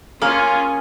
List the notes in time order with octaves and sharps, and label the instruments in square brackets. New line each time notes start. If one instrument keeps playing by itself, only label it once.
[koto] A#3 [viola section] C#4 F4 [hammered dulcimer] G#4 F5